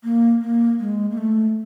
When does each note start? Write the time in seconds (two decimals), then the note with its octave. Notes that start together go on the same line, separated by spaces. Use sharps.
0.04 A#3
0.41 A#3
0.80 G#3
1.11 A#3
1.18 A3